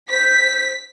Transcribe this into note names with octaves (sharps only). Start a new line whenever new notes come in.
C5 B6